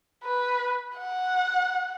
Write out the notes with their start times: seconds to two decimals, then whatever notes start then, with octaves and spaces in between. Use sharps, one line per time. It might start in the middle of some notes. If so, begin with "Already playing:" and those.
0.24 B4
0.97 F#5